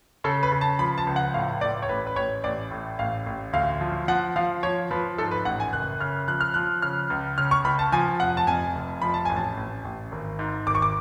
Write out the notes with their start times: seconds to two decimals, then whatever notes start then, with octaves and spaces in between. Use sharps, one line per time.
0.24 C#3 A4
0.43 B4
0.52 C#3
0.61 A5
0.79 F3 B5
0.98 A5
1.07 C#2
1.16 F#5
1.34 A2 F5
1.61 A2 D5
1.83 C#5
1.89 A1 B4
2.07 B4
2.16 A1 C#5
2.44 A1 D5
2.71 A2
2.99 A1 F5
3.26 A1
3.53 D2 F5
3.81 F3
4.08 F3 F#5
4.36 F3 F5
4.63 F3 C#5
4.91 F3 B4
5.18 G#2 A4
5.31 B4
5.45 A1 F#5
5.60 G#5
5.73 F#1 F#6
6.00 C#3 F6
6.28 F3 F#6
6.41 F6
6.54 F3 F#6
6.82 C#3 F6
7.10 C#2
7.38 C#3 F6
7.51 C#6
7.64 C#2 B5
7.79 A5
7.92 F3 G#5
8.20 F1 F#5
8.37 A5
8.47 F2 G#5
8.75 F1
9.02 F3 B5
9.14 A5
9.25 A1 G#5
9.36 A5
9.57 A1
9.85 A1
10.12 G#1
10.39 G#2
10.66 G#1 D6
10.75 C#6
10.82 D6